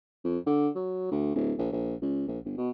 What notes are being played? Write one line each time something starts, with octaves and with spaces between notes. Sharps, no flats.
F2
D3
F#3
D2
D1
A#1
A#1
C#2
A#1
G1
B2